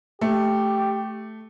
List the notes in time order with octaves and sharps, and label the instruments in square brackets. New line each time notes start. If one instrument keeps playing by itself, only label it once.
[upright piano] A3 [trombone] G4